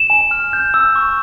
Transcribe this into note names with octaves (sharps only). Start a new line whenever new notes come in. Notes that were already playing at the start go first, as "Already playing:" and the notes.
Already playing: E7
G#5
F6
G6
E6
C#6